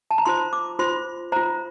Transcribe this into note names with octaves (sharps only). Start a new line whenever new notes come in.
A5
A#5
F4 C5 C6
D6
F4 C5 C6
F4 C5 A#5